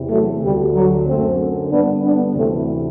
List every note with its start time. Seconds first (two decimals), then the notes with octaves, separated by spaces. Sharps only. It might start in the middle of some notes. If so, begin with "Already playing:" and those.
Already playing: E2 C3 E3
0.10 F#3 A3
0.42 D2 D3 G3
0.74 F#3
1.06 F#2 D3 A3 C4
1.70 G2 D3 B3 D4
2.02 B3 D4
2.35 D2 C3 E3 A3 C4